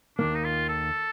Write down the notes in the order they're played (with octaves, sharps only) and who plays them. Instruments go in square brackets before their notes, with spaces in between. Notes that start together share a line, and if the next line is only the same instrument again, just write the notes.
[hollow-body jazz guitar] D#2 D#3 A#3 [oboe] D4
[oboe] D#4
F4
A4